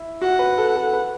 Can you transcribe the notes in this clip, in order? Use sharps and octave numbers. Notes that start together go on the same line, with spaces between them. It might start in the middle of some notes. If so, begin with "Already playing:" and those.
Already playing: E4
F#4 F#5
B4
A4
A4
B4